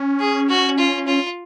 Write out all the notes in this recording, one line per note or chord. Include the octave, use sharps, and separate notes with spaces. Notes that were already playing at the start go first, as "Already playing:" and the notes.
Already playing: C#4
G#4
F#4
F4
F4